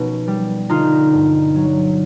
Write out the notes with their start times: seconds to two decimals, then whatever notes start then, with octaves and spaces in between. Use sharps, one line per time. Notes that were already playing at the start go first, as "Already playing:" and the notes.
Already playing: B2 F3 C#4 D#4
0.28 G3
0.69 D3 D#4 F4
1.13 G2
1.56 F#3